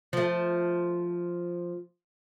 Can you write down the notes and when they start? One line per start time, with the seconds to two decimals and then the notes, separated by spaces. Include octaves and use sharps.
0.13 F3 A3